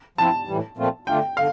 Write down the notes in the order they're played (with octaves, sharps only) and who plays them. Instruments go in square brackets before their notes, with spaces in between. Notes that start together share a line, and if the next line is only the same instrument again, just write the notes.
[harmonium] F3 C4 E4 [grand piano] A5
[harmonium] A2 E3 G3
A#2 F3 A3 C4 F4
[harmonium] D3 A3 D4 F4 [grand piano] G5
[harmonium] D3 [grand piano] F5